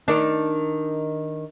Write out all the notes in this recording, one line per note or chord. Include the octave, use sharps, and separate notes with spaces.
D#3 D4